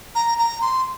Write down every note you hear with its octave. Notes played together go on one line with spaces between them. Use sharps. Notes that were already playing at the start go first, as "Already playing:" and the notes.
A#5
A#5
C6